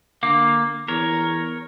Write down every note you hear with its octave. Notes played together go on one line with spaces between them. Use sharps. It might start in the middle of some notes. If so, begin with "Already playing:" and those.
D3 A#3 F5 D6
E2 A#4 C#5